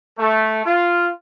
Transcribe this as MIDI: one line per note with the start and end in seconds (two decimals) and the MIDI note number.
0.18 0.65 57
0.65 1.09 65